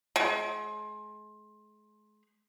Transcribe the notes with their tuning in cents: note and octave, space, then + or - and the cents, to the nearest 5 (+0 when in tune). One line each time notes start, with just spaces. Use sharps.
G#3 +35